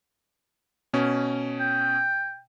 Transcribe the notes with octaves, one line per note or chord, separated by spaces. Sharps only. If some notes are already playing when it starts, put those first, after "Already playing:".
B2 C#4
G5